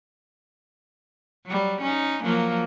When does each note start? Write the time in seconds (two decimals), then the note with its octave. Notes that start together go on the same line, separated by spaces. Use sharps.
1.46 F#3 G3
1.82 C#4 D#4
2.23 F3 F#3 A#3